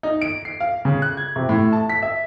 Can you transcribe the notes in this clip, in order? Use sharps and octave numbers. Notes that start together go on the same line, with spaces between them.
D#4
D7
C7
F5
C#3
F#6
G#6
C3
A2
A5
B6
E5